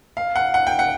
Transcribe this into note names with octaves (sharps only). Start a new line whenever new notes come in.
F5
F#5
F#5
G5
F#5